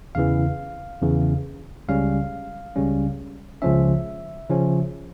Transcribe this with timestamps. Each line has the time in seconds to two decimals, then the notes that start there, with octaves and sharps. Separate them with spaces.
0.15 E2 C#3 E3 F5
1.02 E2 C#3 E3
1.88 C#2 C#3 G3 C#4 F5
2.76 C#2 C#3 G3 C#4
3.62 C#2 C#3 F3 C#4 E5
4.50 C#3 F3 C#4